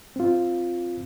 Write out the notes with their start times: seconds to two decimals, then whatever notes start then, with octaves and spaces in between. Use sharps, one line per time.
0.16 C4 F4